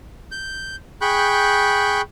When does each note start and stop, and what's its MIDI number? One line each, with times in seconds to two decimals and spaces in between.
0.31 0.76 91
1.01 2.01 68
1.01 2.01 79
1.01 2.01 83
1.01 2.01 85
1.01 2.01 90
1.01 2.01 91